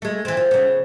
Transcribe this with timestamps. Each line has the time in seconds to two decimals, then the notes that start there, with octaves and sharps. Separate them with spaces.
0.02 G#3 A3
0.25 E3 C4
0.37 F3
0.51 C#3 B3